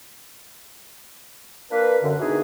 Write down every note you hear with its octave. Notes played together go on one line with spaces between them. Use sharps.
A#3 D4 A#4 B4
F#2 D3
B2 E3 B3 D4 D#4 G#4